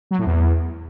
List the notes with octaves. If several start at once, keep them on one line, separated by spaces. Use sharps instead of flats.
F#3
A2
E2